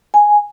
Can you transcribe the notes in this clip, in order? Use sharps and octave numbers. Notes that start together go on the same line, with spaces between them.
G#5